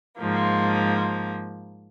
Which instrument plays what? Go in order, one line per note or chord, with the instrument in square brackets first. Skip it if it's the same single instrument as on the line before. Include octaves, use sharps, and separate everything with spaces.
[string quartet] G#2 F3 A#3